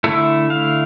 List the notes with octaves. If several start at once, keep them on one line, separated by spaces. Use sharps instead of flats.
D3 A3 E4 A4
F5